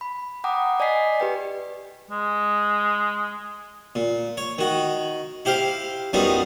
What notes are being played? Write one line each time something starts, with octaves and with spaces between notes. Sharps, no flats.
B5
F#5 G5 A#5 B5 D6 D#6
D5 D#5 G#5 B6 C7
G4 B4 G5
G#3
A#2
C#5
D#3 F#4
E4 G4 C5 F5
F#2 F#3 G3 B3 D#4 F4